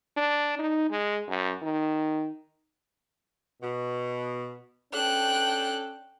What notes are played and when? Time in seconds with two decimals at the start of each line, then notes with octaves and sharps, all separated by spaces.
0.17 D4
0.59 D#4
0.91 G#3
1.29 F#2
1.62 D#3
3.61 B2
4.94 C#4 D4 A4 G5 F#6